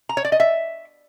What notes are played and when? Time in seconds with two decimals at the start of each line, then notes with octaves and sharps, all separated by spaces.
0.09 A#5
0.17 C#5
0.25 D5
0.32 D#5
0.40 E5